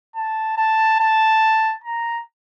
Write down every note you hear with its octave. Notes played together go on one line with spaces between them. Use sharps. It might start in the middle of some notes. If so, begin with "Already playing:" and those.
A5
A5
A5
A#5